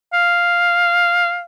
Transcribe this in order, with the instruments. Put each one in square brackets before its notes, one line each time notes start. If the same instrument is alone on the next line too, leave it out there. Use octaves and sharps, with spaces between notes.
[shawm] F5